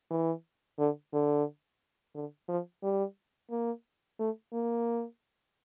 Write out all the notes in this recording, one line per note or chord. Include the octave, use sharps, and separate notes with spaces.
E3
D3
D3
D3
F3
G3
A#3
A3
A#3